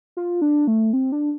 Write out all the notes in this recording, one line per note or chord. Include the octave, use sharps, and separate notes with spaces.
F4
D4
A3
C4
D4